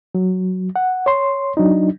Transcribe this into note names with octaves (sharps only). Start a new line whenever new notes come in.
F#3
F#5
C#5 C6
F#3 D4 D#4